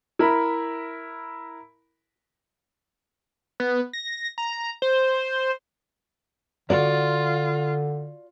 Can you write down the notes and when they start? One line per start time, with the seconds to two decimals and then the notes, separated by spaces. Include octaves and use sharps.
0.19 E4 A#4 B5
3.60 B3
3.93 A#6
4.38 A#5
4.82 C5
6.70 D3 F4 F#4 D5